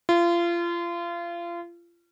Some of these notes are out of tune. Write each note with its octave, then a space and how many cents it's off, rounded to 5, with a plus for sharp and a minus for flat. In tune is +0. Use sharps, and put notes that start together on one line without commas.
F4 -30